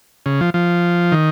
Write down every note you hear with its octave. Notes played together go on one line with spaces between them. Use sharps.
C#3
F3
F3
D#3